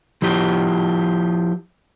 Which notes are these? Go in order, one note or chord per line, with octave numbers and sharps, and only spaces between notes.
F3 E4 G4